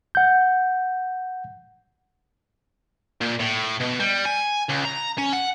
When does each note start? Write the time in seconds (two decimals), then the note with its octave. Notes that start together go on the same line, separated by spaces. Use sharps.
0.15 F#5 G6
3.21 A#2
3.40 A2
3.80 B2
4.00 G3
4.26 G#5
4.69 C#2
4.85 A#5
5.18 C#4
5.33 F#5